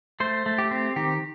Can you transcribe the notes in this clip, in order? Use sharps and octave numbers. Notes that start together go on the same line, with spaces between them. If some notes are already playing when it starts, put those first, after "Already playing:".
A3 C5
A3
G4
C4
D#3 G4